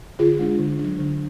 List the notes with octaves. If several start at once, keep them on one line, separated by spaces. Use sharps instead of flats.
D3 F4 G#4
G#3 D4
D3
F#3 D4
D3